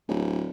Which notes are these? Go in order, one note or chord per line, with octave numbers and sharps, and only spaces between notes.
D1